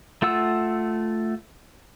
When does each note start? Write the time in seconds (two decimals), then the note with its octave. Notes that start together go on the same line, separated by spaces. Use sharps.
0.22 A3 F4 F#5 E6